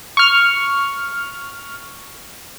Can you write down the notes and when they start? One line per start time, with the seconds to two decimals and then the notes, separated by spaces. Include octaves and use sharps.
0.17 C#6 F6